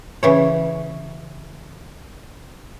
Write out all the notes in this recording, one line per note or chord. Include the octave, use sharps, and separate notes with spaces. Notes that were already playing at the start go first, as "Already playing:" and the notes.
C#3 E3 C#5